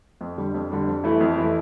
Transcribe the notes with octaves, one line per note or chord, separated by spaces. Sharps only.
F2
D3 G3
F2
D3 G3
F2
E3 A3 E4
F2
E3 A3 E4